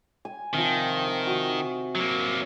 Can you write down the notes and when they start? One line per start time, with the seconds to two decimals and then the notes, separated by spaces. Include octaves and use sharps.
0.25 G#5
0.53 C3 D#3 F3
1.07 F5
1.27 F#4
1.95 F#3 A#3